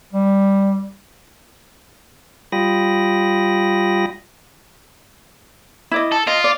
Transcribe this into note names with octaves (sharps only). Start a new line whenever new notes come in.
G3
G3 F4 G5 B5 D#6 A#6
E4 D5 D#5
A4
F4 D#5
D5